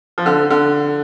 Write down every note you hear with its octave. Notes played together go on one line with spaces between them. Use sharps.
F3
D3
D3